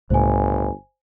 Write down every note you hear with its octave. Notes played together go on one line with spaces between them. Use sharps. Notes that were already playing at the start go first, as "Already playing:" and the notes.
G1 C#2 A2 C5 G#5